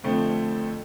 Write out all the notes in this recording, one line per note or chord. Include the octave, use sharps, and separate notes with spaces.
F2 D3 F3 A3 C4